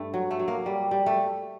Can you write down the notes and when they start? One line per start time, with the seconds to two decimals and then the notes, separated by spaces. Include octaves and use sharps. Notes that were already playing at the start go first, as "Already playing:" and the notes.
Already playing: G2 A3
0.14 F#3
0.31 A3
0.39 F#3
0.48 A#3
0.66 G3
0.91 G3
1.06 A3